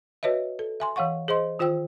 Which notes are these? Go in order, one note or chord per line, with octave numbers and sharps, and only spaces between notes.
F#4 B4 C#5 D#5 E5
A4
E5 G#5 C6
E3 C#5 F5 F#5 C#6
G#4 C5 D#5 C6
D#3 F4 C5 G5 E6